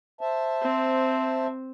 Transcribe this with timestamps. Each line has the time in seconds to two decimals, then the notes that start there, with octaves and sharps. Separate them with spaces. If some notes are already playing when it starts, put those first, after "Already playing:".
0.21 C5 E5 A5
0.62 C4